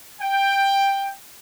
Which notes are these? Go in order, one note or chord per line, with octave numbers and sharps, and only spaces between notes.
G5